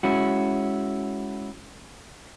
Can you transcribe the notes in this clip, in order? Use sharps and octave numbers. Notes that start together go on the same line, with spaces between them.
G#3 C#4 E4 F#4